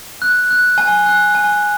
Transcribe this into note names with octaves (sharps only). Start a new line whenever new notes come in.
F#6
F#6
G#5
F#6
G#5